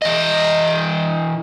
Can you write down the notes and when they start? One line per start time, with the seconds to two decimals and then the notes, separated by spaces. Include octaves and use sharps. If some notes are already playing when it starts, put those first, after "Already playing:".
0.02 E3 D#5